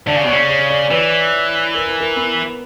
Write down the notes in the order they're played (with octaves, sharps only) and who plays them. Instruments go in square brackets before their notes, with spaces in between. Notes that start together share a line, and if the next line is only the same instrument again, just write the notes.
[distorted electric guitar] D3 [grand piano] D5
[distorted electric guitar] C#3
B2
[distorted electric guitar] C#3 [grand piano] C#5
[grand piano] C#5
D5
[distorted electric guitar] E3 [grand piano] B4
[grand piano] A#4
B4
A#4
B3